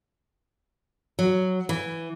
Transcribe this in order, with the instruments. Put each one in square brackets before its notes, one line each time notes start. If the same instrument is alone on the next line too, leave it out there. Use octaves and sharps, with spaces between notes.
[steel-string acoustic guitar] F#3
E3